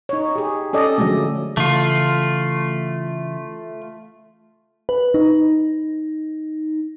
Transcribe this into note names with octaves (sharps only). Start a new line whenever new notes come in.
D#4 C#5
G4 G#4
C#4 A4 D5 D#5
D3 F3 F#3 G#3 A3
C#3 E3 A3 F4
B4
D#4